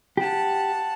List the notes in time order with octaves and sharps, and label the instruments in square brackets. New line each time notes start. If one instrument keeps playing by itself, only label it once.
[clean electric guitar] G4 [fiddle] F#5 A5